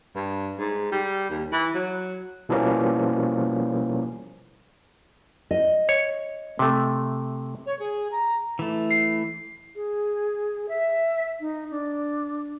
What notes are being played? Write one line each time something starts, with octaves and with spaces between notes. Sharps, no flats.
G2
G#2
G3
D#2
E3
F#3
B2 E3 F3 G3 A#3 C#4
D#5
C#5
C3 A3
C#5
G#4
A#5
E3 A3
C7
G#4
E5
D#4
D4